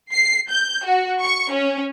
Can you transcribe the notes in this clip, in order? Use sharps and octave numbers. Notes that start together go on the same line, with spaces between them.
C7
G6
F#4
C#6
C#4